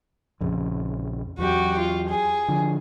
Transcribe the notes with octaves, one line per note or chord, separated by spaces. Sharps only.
A#1 F2 C#3
E2 F#3 F#4 G4
F4
G#4
D3 F3